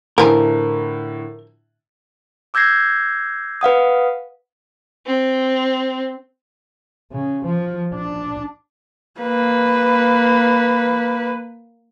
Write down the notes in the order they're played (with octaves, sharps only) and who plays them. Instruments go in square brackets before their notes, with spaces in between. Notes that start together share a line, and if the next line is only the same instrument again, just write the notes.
[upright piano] A2 D3 [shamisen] E3 F3 [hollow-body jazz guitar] A#4
[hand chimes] D6 E6 G6 G#6 A#6 C7
B4 F5 F#5 D#6
[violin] C4
[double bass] C#3
F3
D4
[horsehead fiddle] A#3 B4